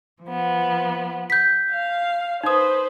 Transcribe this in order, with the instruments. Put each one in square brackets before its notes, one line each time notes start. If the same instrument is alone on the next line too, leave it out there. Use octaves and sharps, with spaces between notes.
[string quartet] F3 B3
[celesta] G6 B6
[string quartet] F5
[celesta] D#4 D#6 [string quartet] B4 C5